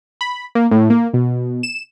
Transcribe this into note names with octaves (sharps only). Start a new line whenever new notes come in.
B5
A#3
A2
A#3
B2
E7